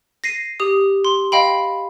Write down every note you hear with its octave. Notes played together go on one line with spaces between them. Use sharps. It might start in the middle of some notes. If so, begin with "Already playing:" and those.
A#6 C7 D#7
G4 D#6
C6
D#5 F5 G5 B5